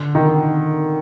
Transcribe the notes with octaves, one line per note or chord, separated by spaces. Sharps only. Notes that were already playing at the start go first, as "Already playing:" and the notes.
Already playing: D3
D#3